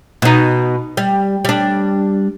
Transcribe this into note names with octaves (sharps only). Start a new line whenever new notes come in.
B2 D#4
G3
G3 D4